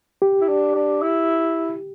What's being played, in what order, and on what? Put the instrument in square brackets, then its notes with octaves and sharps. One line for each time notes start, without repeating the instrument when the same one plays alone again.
[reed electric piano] G4
[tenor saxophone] E4
D4
D4
E4